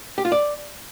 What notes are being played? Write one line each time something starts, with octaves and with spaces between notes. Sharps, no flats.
G4
F4
D5